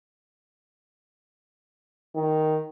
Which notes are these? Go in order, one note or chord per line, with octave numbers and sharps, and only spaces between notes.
D#3